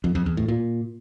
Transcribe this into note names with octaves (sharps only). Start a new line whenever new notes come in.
F2
F2
E2
A2
A#2